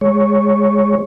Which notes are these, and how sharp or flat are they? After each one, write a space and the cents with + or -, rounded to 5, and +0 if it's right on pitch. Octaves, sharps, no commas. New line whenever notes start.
G#3 -5 C#5 +0